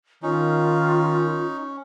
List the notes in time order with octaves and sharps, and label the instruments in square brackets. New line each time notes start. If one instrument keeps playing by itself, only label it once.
[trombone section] D#3 [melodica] C#4 [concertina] D#4 [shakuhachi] F4